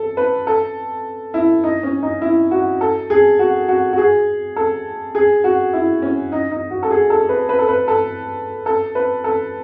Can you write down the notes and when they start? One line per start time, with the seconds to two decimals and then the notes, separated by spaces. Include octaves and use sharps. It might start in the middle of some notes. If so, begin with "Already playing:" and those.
Already playing: A4
0.17 B4
0.47 A4
1.34 E4
1.64 D#4
1.83 C#4
2.03 D#4
2.22 E4
2.51 F#4
2.81 A4
3.10 G#4
3.39 F#4
3.68 F#4
3.93 F#4
3.98 G#4
4.56 A4
5.15 G#4
5.44 F#4
5.73 E4
6.02 C#4
6.32 D#4
6.51 D#4
6.71 F#4
6.83 A4
6.90 G#4
7.10 A4
7.29 B4
7.49 B4
7.59 A4
7.68 B4
7.88 A4
8.66 A4
8.95 B4
9.24 A4